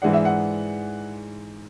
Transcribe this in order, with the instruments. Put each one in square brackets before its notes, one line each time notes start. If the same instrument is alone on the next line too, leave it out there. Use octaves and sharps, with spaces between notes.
[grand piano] G#2 E3 G#3 D4 [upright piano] F#5
[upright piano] E5
F#5